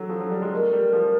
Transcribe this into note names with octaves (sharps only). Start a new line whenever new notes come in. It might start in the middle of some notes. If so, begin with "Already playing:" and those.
Already playing: E3 F#3 A4
F3
F#3
G3
G#3
A3 A#4
G3
F3